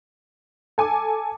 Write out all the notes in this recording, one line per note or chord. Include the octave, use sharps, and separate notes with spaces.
A4 G#5 D6